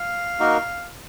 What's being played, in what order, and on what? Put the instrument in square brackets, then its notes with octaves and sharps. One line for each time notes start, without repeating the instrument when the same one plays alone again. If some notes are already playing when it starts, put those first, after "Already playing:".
Already playing: [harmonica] F5
[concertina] A#3 D#4 F#4 A#4